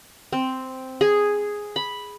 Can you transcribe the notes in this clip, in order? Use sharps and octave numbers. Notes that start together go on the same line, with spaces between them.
C4
G#4
B5